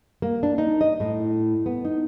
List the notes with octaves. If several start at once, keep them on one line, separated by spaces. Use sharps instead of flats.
A#3
D4
D#4
D#5
A2
B3
D#4